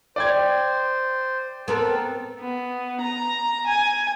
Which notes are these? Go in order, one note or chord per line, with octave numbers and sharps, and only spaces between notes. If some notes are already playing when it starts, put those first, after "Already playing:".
C5 D5 G5 G#6
B3 C4 A4 A#4
B3
A#5
G#5